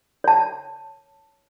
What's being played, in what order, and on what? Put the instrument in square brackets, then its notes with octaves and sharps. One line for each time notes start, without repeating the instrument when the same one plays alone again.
[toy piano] C#5 A5